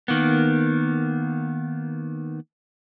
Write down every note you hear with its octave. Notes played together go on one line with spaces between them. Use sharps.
D#3 A#3 B3